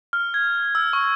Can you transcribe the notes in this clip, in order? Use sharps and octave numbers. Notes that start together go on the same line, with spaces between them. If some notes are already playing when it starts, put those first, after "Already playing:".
F6
G#6
E6
C#6